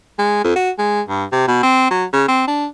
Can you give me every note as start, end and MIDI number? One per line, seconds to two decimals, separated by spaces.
0.19 0.44 56
0.44 0.55 41
0.56 0.70 66
0.78 1.01 56
1.09 1.24 43
1.32 1.46 48
1.48 1.63 47
1.63 1.88 60
1.91 2.05 54
2.13 2.24 49
2.28 2.44 60
2.48 2.66 62